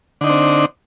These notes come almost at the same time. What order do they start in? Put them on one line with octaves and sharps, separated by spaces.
D3 D#4 D4 C4